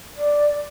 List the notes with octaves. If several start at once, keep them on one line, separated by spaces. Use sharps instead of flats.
D5